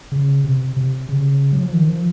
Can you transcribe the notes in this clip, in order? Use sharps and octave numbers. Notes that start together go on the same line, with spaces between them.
C#3
C3
C3
C#3
F#3
F3
D#3
F3